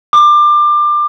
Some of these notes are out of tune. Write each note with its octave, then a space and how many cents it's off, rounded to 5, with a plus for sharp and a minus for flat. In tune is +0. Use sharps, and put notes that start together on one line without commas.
D6 +25